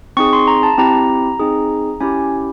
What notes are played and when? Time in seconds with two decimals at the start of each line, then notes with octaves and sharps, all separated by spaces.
0.17 C4 D#4 G#4 C#6
0.33 C6
0.47 A#5
0.63 A5
0.78 C4 E4 G4 A#5
1.40 C4 D#4 G#4
2.00 C#4 E4 G4 G#5